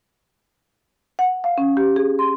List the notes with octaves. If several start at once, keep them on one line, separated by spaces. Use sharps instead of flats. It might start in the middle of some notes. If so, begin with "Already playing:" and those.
F#5
F5
C#4
G4
G#4
C6